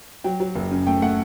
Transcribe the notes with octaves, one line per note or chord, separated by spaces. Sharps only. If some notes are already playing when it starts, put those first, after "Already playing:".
F#3 G5
F#3
F#1
F#2
A3 G5
A3 F#5